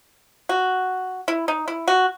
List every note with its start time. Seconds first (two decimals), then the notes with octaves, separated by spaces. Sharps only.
0.49 F#4
1.28 E4
1.48 D#4
1.68 E4
1.88 F#4